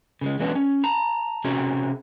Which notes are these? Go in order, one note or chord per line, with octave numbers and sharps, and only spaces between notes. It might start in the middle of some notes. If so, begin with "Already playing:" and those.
C#3 F3 G#3
E3 F#3 G#3 B3 C#4 D4
C#4
A5 A#5
C3 C4 C#4 F#4 G#4 A#4